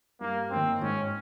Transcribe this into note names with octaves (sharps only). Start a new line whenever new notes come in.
G2 A#3
D#3 A#3 C4 C#4
G#2 C#4